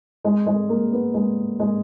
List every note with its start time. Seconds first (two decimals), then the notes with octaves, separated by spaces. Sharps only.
0.25 G#3
0.46 G#3
0.69 A#3
0.92 B3
1.14 G#3
1.60 G#3